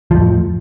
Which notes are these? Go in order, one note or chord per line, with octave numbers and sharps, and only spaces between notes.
F2 A2 F3